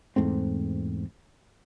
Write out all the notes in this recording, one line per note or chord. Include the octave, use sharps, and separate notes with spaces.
E2 G#2 A3 C4